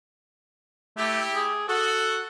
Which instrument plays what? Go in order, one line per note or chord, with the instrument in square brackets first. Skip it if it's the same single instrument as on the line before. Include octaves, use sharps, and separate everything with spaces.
[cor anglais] A3 [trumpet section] E4 G4
[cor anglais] G#4
[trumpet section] F#4 [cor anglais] A4